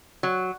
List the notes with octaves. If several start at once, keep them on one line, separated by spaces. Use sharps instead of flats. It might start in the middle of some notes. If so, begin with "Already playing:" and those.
F#3